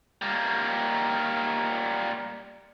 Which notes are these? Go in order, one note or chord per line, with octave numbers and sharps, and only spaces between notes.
G3 A#3